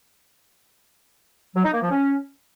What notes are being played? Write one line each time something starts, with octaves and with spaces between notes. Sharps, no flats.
F#3
D#4
A#3
F3
C#4